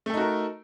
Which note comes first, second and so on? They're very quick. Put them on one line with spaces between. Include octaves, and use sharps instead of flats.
A3 A4 D#4 F#4 A#4